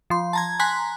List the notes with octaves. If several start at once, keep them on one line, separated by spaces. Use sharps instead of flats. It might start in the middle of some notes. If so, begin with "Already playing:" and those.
F3 C6
A5 A#5 G#6
G#5 A#5 C6 F#6 B6